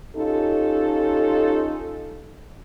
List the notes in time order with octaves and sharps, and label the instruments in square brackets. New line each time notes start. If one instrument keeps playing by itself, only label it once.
[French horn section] C#4 D#4 F4 G4 A4